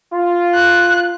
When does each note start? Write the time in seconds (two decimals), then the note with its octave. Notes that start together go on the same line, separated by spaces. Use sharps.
0.12 F4
0.54 F#6